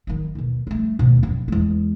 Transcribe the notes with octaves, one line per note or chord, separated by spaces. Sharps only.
D#3 F#3
D#2 B2
G3 A3
D#2 B2
F#2
E2 G#3